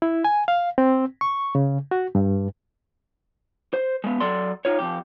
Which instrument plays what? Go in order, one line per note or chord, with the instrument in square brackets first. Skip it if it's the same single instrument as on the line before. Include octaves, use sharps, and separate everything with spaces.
[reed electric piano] E4
G#5
F5
C4
C#6
C#3
F#4
G2
[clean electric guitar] C5
G#3 B3
F#3 A4 D5 C6
D#4 F4 C#5
F2 G#2 G4